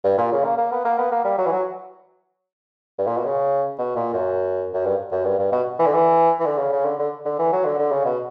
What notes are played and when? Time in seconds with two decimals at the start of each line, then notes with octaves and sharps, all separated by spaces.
0.04 G2
0.18 A#2
0.32 C#3
0.44 A#3
0.57 A#3
0.72 B3
0.85 A#3
0.98 B3
1.12 A#3
1.25 G3
1.38 F#3
1.46 E3
1.52 F#3
2.99 G2
3.07 A#2
3.17 B2
3.25 C#3
3.78 B2
3.96 A#2
4.13 F#2
4.74 F#2
4.85 G2
5.12 F#2
5.25 G2
5.39 G2
5.52 B2
5.79 E3
5.86 D3
5.94 E3
6.40 E3
6.46 D3
6.58 C#3
6.72 C#3
6.85 D3
6.99 D3
7.25 D3
7.39 E3
7.52 F#3
7.65 D3
7.79 D3
7.92 C#3
8.05 B2